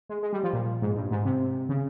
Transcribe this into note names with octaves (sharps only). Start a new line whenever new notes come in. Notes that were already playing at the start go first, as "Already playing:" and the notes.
G#3
G#3
G3
F3
A#2
G#2
G2
G#2
C3
C#3